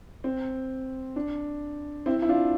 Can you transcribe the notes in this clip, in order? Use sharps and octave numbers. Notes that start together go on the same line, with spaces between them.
C4
D4
C4 E4
E4
D4 F4